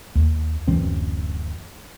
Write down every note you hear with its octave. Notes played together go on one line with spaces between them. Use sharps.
D#2
D1 F#2 E3 C4